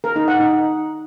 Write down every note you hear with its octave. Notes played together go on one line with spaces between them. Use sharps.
A#4
D#4
F#5
D#4